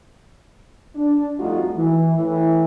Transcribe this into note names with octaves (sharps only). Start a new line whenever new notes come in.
D4
F2 G3 A3 D#4 F4 F#4
E3
A2 E3